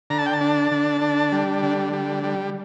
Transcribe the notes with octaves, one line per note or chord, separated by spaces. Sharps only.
D3 A#5
A5
G5
A5
D4
D3
D4
G3
D3
G3
G3